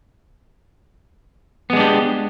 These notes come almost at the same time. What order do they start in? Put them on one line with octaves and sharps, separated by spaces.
B3 G#3 D4 G4